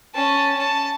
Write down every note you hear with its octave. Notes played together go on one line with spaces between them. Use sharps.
C#4 A5
C#4 A5